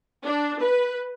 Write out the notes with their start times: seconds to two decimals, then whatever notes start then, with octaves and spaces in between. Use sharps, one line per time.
0.25 D4
0.62 B4